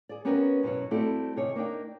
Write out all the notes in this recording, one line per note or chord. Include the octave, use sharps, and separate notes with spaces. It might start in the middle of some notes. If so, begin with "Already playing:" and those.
G#4 D5
B3 C#4 G4 A#4 B4 E5
F#2 B2 E4 C#5
G3 A3 C4 E4 F#4 A4
C3 D#3 G#4 C#5
A#3 D4 D#4 G5